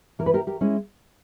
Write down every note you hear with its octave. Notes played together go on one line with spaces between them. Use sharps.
E3 A#4
B4
G4 A#4
G4 A#4
G#3 C#4 E4